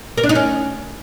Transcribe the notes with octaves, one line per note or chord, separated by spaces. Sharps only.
A#4
D4
D#4
C#4